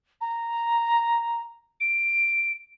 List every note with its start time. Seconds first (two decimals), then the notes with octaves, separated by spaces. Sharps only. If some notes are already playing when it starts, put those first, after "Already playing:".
0.21 A#5
1.80 D7